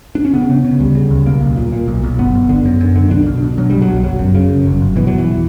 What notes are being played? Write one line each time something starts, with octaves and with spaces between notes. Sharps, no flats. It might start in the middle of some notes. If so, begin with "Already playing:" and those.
D4
C#4
C#3 B3
C#3
C#3
D2 G3
C#3
D2
B1 A#3
B1
A#2
A#2
B1
B1
G1 B3
G1
D3
F#2
F#2
D3
B1 D4
B2
B2
B2 F#3
B2 G3
F#3
B1
G1 F#3
F#2
C#3
F#2
G1
G1
B2 E3
E1 F#3
E3